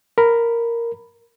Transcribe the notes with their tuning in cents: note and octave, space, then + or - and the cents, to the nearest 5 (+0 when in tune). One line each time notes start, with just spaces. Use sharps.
A#4 -5 B5 +0